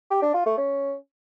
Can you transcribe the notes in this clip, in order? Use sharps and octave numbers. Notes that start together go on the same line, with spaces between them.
G4
D4
F4
A3
C#4